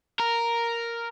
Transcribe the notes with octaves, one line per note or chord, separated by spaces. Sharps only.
A#4